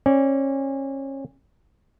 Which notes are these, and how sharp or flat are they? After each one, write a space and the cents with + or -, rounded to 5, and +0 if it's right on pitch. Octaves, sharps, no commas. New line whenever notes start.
C#4 -30 D5 -25